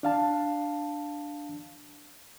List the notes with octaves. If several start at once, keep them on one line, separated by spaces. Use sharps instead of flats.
D4 F5 A5